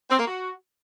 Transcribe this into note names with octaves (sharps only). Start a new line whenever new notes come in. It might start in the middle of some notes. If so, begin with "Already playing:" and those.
C4
A#3
F#4